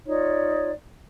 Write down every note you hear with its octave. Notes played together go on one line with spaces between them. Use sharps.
D#4 F4 C#5 D5